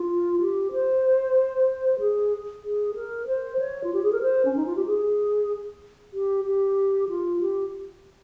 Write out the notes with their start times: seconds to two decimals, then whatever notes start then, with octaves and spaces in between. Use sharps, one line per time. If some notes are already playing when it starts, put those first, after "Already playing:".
Already playing: F4
0.41 G4
0.72 C5
2.00 G#4
2.63 G#4
2.95 A#4
3.27 C5
3.59 C#5
3.84 F4
3.94 G4
4.03 G#4
4.13 A#4
4.22 C5
4.45 C#4
4.56 D#4
4.66 F4
4.76 G4
4.86 G#4
6.13 G4
6.45 G4
7.09 F4
7.41 G4